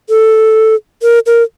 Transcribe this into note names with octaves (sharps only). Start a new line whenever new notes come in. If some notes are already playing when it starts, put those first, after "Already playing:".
A4
A#4
A#4